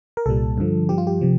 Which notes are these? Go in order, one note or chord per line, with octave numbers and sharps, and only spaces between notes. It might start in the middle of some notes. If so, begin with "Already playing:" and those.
A#4
C2 A#2 G3 A4
G2 D3 F3
G2 F3 G4
F4
G4
C3 F3